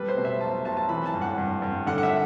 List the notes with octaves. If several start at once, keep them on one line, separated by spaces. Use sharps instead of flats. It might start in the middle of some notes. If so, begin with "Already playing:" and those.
Already playing: G3 A3 B4
C5
B2
E5
B1 A5
B1 A5
A5
E3 B5
A5
G2
F#5
G2
G2
D3 F#5
F#5
E5